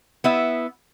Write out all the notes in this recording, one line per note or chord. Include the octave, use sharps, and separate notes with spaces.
B3 E4 E5